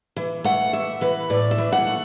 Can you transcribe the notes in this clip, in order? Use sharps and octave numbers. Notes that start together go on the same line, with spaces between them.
E3
A3 F#5
E3 E5
E3 B4
A2 D5
E5
E3
F#5
A3